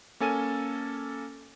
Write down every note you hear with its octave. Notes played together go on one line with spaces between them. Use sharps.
A#3 C#4 A4 G#5 D#7